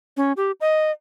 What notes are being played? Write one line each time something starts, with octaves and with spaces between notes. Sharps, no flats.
C#4
G4
D#5